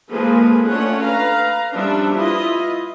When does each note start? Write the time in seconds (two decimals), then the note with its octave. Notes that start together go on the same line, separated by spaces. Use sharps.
0.10 F3 G#3 A#3 G#4 A4 B4
0.69 A3 C#4 D4 F4 C#5 F#5
1.03 B4 F5 A#5
1.74 F3 G3 C#4 D4 E5
2.15 E4 F4 B4 D#5